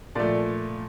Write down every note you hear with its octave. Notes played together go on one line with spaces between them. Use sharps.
A#2 F3 A3 D5